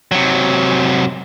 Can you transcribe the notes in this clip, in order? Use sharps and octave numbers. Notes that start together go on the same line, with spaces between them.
C3 F#3